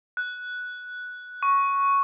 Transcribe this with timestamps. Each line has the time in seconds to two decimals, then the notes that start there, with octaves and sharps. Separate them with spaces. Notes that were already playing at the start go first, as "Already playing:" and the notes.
0.17 F#6
1.43 C#6